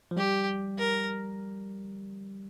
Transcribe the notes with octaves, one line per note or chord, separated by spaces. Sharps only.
F3
G3 G4
A#4